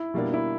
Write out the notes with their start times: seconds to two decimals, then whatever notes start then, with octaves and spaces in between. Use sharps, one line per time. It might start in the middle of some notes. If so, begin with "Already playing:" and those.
Already playing: E4
0.14 B2 G3 A#3 D4
0.34 E4